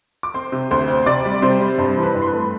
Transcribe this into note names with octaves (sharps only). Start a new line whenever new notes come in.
D6
C4 C5 C6
C3
D2 C5 C6
C4
C3 D5 D6
G3
C3 C5 C6
G3
G2 C5 C6
E3
B4 B5
G2
C6
B4 B5
A3